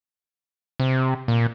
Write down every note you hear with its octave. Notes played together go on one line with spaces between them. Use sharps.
C3
A#2